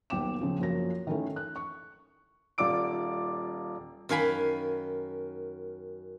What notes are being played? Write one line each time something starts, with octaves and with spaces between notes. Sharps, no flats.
D#1 B1 G5 D6 E7
C#3 F3
A#1 F#2 F3 F#4 A#6
D#3 E3 A3 C#4 E4
F#6
C#6
D#1 F4 D5 D6 D7
F#2 D#3 F5 G#5 B5